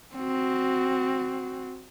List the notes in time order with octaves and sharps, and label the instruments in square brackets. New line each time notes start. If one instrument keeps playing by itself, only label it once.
[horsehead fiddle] C4 F#4